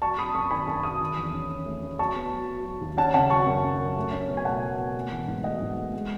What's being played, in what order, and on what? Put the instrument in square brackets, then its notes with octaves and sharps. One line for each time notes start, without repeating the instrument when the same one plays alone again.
[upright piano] F#3 A5 C#6
F#3 B5 D#6
F#2 A5 C#6
D#3 G#5 B5
F#2 A5 C#6
F#3 B5 D#6
D#3
E2
C#4
C#4
A3
C#4
F#3 A5 C#6
B3
F#3
F#3
F#3
D#2
C#4 F#5 A5
C#3 F#5 A5
F#3 A5 C#6
F#2
C#4
F#2
A3
C#4
B2
G#5
A3 F#5 A5
B2
B2
A3
E3
G#2
A3 D#5 F#5
G#2
A3
G#3